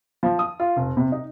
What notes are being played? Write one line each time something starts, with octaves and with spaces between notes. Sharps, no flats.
F3
D#6
F4
F1
C3
D#4